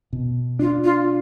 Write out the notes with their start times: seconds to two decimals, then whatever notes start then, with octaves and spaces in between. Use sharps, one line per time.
0.13 B2
0.59 D4 F4
0.84 F4